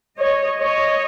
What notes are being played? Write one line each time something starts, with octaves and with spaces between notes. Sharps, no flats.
C#5 D#5
C#5 D#5